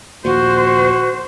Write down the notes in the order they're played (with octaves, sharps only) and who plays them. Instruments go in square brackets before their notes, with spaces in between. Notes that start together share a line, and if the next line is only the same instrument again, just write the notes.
[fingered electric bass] A#1 D#2 A#2 [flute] F#4 [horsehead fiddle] C5